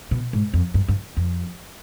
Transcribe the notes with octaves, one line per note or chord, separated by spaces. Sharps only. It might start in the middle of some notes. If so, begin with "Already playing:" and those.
B2
G#2
F2
G2
G2
F2